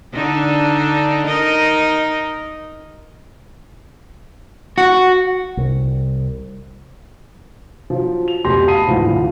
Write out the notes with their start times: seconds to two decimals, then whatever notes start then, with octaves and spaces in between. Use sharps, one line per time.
0.13 D3 D4 D#4
1.26 D#4 A#4 D#5
4.78 F#4
5.57 C2
7.90 F3 F#3
8.28 F7
8.44 F1 C#2 B2 G4 C6 A#6
8.68 F5 A5 B5 D#6 C7 D#7
8.87 D2 G#2 D3 E3 F3
9.07 D2 F4